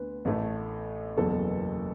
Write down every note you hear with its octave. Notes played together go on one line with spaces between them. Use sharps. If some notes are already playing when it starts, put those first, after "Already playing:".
Already playing: D2 D3 B3 B4
A1 A2 A3
F#1 E2 B2 A4